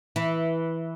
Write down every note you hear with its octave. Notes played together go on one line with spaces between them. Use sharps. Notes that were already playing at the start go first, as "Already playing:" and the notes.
E3